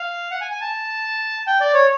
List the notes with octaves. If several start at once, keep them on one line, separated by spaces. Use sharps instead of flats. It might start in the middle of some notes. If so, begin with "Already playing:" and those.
Already playing: F5
F#5
G#5
G#5
A5
G5
D5
C#5